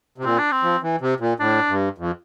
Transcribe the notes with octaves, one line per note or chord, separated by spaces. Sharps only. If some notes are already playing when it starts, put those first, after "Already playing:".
C3
A#2 C4
D4
C4
F3
E3
C3
A#2
A2 D4
G2
F2